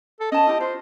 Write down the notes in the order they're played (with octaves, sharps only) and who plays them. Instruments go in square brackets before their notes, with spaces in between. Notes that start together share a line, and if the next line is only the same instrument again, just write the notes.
[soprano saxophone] A4
[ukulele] C#4 A5 [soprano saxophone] D#5
[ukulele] E4 G4
[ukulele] F4 [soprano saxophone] C5